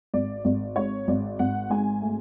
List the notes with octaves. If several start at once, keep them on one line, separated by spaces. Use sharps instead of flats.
G#1 D5
G#1 D5
G#2 C#5
G#1 D5
G#1 F#5
G#2 G#5
A3